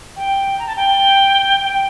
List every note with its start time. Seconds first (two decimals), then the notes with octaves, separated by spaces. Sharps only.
0.17 G5
0.59 A#5
0.67 A5
0.76 G5
1.64 G5